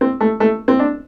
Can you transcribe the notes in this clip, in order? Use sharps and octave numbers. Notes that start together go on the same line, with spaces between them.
C4
A3
A3
C4
D4